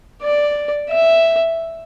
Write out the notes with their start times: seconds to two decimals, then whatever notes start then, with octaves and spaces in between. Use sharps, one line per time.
0.23 D5
0.90 E5